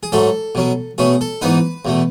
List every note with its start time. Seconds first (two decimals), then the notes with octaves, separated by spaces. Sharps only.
0.03 G#4
0.12 G#2 F#3 A3 C#4 A4
0.55 B2 F#3 C#4
0.98 B2 A3 C#4 G#4
1.21 A4
1.41 G#2 E3 B3 D#4 B4
1.85 E2 B2 A3